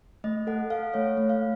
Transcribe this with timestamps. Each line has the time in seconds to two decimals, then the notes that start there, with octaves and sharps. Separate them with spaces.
0.24 A3 D#5
0.47 A4 F#5
0.70 A4 F5
0.94 A3 C#5
1.17 A3
1.29 F5